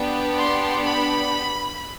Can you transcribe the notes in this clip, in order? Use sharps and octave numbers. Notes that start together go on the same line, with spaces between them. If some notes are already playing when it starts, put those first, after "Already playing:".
Already playing: B3 D4 G4
C6
B5